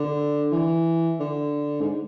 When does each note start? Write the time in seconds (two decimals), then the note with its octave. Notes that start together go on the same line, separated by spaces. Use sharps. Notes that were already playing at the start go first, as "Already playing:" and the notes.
Already playing: D3
0.52 E3
1.20 D3
1.81 G#2